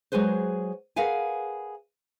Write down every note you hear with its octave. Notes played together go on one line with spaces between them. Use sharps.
F#3 G#3 G#4 B4 C5
G#4 A#4 B4 F5 F#5 G#5